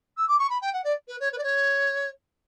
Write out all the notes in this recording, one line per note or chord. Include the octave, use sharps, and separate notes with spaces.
E6
D6
C#6
B5
G5
F#5
D5
B4
C#5
B4
D5
C#5